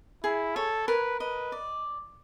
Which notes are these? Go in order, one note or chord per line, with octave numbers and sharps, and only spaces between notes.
E4 G#4
A4 C#5
A#4 B4
B4 D#5
D5